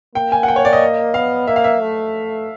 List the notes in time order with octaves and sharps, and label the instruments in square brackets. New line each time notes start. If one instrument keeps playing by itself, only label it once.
[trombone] A#3 [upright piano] G5
[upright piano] G#5
F#5
G5
C#5
D5
D#5
[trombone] B3 [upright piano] F5
[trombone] A#3 [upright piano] E5
[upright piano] F5
E5
[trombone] A3